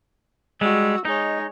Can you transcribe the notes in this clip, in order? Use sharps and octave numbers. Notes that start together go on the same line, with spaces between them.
G3 G#3 F#4 E6
G#3 D#4 C#5